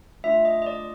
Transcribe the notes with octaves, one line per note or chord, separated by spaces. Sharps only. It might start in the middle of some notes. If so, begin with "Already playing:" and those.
A3 D4 F4 E5
D#5
D#5
D5